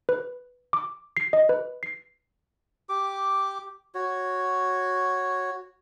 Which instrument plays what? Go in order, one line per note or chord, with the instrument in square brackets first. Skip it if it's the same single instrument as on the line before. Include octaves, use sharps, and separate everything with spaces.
[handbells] B4
D6
C7
D#5
B4
C7
[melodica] G4 D6
F#4 C#5